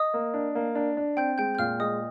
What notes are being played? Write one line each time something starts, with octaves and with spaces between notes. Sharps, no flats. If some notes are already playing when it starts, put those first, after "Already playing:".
Already playing: D#5 D#6
A#3
D4
A#3
D4
D4
C4 G5 G6
G#3 G5 G6
G6
A#2 F5 F6
G#3 D#5 D#6